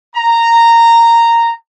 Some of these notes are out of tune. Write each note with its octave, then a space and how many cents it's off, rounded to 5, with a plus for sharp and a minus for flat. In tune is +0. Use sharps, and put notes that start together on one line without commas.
A#5 -10